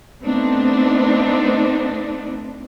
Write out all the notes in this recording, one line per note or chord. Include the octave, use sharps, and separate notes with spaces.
A3 B3 C4 D4 D#4